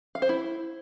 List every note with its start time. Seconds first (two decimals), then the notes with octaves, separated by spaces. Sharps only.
0.15 F5
0.22 C5
0.29 E4